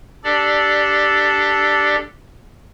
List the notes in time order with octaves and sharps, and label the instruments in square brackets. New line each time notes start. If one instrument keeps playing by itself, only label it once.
[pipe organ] D4 G4 A4 D5